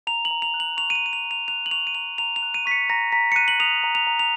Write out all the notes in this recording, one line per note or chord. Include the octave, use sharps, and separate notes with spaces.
A#5 F7
F#7
A#5
F7
F#6
F#7
C#6 F7
D#7
F7
A#5 D#7
F7
A#5
F7
F#6 F7
F#7
C#6 F7
D#7
A#5 F7
A#5 F7
F7
F#6
D#7
C#6 B6
C#7
A#5 A#6
A#5 B6
C#7
F#6 D#7
F#7
D#6 F7
A#5
F7
A#5
F7